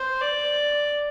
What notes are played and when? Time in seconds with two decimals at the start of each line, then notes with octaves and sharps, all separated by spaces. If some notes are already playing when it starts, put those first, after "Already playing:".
Already playing: C5
0.21 D5